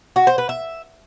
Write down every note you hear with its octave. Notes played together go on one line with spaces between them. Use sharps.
F#4
C5
B4
E5